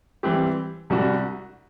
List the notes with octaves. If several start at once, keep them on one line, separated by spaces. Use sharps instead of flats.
E3 G3 C4 G4
C2 C3 G3 D4 F#4